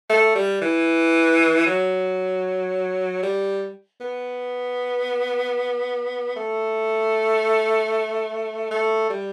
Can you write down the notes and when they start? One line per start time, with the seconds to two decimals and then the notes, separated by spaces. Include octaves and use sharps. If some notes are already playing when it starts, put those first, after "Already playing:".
0.10 A3
0.35 G3
0.62 E3
1.67 F#3
3.23 G3
4.01 B3
6.36 A3
8.71 A3
9.10 G3